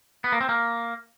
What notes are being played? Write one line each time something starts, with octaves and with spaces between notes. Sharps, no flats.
B3
A#3
C4
A#3